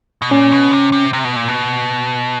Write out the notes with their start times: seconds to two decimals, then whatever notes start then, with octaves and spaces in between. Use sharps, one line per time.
0.22 B2
0.31 A#2 C#4
0.52 B2
0.72 C3
0.92 C3
1.13 C3
1.25 B2
1.36 A#2
1.48 B2